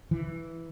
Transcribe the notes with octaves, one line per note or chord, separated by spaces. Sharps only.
E3